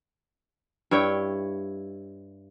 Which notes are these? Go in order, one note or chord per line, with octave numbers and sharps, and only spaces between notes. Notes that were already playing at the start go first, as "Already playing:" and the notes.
G2 E4 C#5 G5